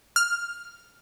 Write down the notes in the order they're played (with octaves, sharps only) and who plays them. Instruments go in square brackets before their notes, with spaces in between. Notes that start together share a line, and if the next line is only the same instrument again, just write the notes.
[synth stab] F6